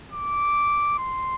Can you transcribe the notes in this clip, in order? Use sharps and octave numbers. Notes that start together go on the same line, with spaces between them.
D6
C6